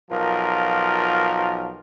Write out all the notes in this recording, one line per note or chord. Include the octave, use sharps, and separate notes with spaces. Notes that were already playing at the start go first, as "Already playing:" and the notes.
B1 F3 F4 A#4